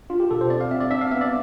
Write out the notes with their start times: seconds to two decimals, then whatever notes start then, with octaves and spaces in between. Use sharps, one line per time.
0.10 D4 F4
0.20 G4
0.31 B2 A4
0.41 C5
0.50 C4 D5
0.61 F5
0.71 C4 E5
0.81 D5
0.91 D4 E5
1.01 F5
1.11 B3 E5
1.21 D5